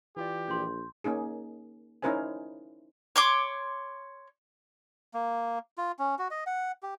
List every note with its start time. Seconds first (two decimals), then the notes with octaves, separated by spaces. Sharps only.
0.17 E3 F4 G4 D5
0.48 A#1 C6 G6
1.04 A#3 C#4 D#4 G#4
2.02 C#4 D#4 E4 A#4 C5 G#5
3.16 C#5 C6 D6
5.14 A#3
5.78 F4
5.99 C#4
6.19 F#4
6.31 D#5
6.47 F#5
6.83 G4